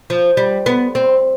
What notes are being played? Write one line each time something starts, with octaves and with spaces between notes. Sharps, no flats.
F3
G3
B3
C4